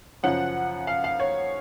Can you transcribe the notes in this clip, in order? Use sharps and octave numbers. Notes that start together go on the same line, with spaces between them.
F#2 C#3 F3 F#5
F5
F5
C#5